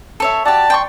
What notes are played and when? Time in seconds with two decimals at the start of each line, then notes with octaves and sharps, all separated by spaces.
0.20 A4 C#5 E5
0.45 F#4 G4 D5 A5
0.70 G5 C6 C#6